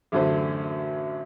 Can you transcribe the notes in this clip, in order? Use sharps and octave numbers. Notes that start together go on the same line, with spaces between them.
A1 F#2 D3 C5